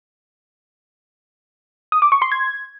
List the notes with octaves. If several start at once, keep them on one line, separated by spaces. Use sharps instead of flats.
D#6
D6
C#6
C6
G#6